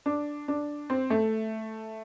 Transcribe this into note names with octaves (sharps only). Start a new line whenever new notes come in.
D4
D4
C4
A3